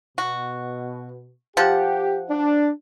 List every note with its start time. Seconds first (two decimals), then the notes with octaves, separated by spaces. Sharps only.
0.18 B2 F#4
1.57 F3 G4 F#5
2.30 D4